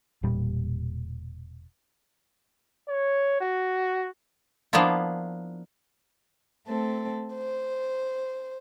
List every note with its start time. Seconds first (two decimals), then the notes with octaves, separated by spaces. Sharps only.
0.23 E1 A#2 G3
2.89 C#5
3.41 F#4
4.73 F3 A#3 B3 D4 E4 F4
6.68 A3 C4 A4
7.35 C5